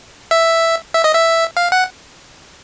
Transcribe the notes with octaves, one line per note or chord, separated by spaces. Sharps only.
E5
E5
D#5
E5
F5
F#5